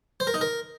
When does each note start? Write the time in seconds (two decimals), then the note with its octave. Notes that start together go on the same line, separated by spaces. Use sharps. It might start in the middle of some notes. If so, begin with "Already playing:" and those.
0.20 C5
0.27 A#4
0.34 D#4
0.41 A#4